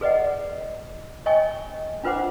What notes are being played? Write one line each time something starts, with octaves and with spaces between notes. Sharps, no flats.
G#4 B4 D5 D#5 F#5
C#5 D#5 G5 G#5 C#6
D4 F4 B4 C5 F#5 D6